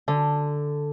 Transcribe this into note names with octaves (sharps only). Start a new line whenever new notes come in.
D3